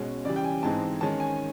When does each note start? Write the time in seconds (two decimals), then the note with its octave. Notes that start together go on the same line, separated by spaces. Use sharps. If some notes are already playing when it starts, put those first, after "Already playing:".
Already playing: B2 G#3 C#4
0.25 C#3 E3 G3 D5
0.36 G5
0.44 G#5
0.62 G#2 E3 G#3 C4 D#4 A5
1.01 D#3 G#3 C#4 A5
1.20 G#5